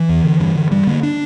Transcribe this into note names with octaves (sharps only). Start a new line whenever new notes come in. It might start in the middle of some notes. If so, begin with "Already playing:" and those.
Already playing: E3
E2
D3
G2
D3
G2 G3
D3 A#3
D4